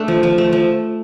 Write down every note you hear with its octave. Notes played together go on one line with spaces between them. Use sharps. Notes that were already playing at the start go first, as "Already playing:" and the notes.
Already playing: A3 D4
F3
F3
A3
F3